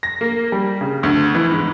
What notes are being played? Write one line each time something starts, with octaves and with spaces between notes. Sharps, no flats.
A#6
A#3
G3
C#3
D2
E3
G#2